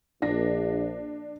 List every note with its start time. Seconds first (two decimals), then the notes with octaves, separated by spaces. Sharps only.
0.22 A#1 D4 A#6